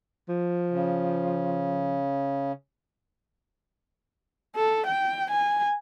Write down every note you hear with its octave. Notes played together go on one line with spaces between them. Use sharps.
F3
C#3
A4
G5
G#5